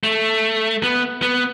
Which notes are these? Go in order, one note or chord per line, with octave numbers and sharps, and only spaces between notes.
A3
B3
B3